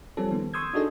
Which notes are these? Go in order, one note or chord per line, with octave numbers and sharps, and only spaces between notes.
F3 G3 C4 C#4 A4
D#3 B3
C6 C#6 D#6 E6 G6 G#6
D4 D#4 F#4 G#4 A4 D#5